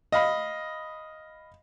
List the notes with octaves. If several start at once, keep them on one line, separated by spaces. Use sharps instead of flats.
D#5 F5 B5